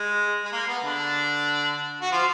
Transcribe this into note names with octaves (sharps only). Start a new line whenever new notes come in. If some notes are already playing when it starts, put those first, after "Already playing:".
Already playing: G#3
G#3
A#3
B3
D3 D4
F#4
F3 F4